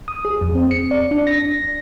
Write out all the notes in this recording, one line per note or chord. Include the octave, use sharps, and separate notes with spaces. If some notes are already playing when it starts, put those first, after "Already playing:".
D#6
G#4
F2
C4
C#7
D5
D4
A#6